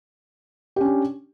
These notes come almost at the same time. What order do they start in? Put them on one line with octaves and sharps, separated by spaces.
G4 C#4 D4